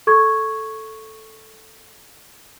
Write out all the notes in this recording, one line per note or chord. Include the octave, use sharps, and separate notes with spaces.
A4 C#6 G#6